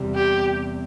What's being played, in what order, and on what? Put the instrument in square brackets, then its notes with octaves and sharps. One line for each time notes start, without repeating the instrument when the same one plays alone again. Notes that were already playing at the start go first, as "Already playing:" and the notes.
Already playing: [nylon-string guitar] E2 C3 G3
[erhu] G4